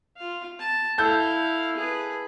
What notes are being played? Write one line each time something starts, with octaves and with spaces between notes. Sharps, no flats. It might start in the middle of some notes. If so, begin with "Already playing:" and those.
F4 F5
A5
E4 A4 F5 G6
G#4 B4